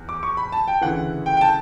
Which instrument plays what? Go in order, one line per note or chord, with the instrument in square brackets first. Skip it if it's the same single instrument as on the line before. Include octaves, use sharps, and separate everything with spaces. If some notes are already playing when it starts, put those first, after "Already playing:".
Already playing: [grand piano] E2
D6
C#6
B5
A5
G5
D2 C#3 E3 F#5
G5
G5
A5